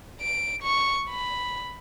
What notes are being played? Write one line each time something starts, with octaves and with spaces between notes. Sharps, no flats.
D7
C#6
B5